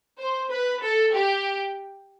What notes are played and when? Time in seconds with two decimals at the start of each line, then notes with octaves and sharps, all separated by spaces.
0.18 C5
0.51 B4
0.83 A4
1.14 G4